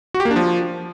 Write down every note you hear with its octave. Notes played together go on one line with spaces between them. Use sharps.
F#4
G4
A#3
D4
F3